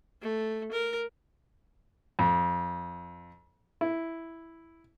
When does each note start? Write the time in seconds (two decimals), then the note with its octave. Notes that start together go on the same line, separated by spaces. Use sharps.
0.22 A3
0.72 A#4
2.19 F2
3.81 E4